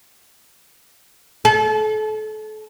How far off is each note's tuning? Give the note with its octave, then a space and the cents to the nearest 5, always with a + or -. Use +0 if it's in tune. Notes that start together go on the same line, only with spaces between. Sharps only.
A4 -35